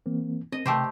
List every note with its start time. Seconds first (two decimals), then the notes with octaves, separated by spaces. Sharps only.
0.06 E3 A#3 C4
0.52 C4 D#5
0.66 C3 A3 G4 C5 G5